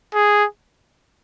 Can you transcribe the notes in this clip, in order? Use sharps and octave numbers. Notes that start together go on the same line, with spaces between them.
G#4